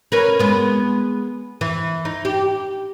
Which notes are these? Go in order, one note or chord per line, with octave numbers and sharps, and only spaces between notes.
C#4 A#4 B4
G#3 B3
E3
D#4
G4